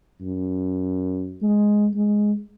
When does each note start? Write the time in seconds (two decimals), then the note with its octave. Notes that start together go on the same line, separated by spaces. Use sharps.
0.20 F#2
1.42 G#3
1.94 G#3